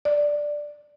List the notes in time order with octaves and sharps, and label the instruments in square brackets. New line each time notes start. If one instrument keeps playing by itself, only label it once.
[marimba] D5